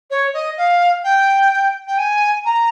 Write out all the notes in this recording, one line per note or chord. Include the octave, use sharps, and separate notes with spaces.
C#5
D#5
F5
G5
G5
G#5
A#5